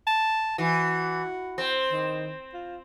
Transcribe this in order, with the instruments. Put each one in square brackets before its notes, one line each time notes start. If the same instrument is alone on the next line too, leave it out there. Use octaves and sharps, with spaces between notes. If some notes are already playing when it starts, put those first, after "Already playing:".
[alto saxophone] A5
[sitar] E3 [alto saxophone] F#4
[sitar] C4
[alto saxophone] D#3
F4